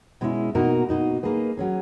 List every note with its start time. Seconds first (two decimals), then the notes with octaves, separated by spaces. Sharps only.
0.21 B2 G#3 C#4 E4
0.55 B2 A#3 D#4 F#4 A#4
0.89 B2 A#3 D#4 F#4
1.23 A#3 D#4 G#4 B4
1.57 F#3 C#4 G#4